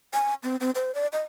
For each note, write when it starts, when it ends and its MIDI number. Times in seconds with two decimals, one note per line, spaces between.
0.14 0.34 80
0.43 0.56 60
0.60 0.71 60
0.75 0.94 72
0.95 1.07 74
1.13 1.21 75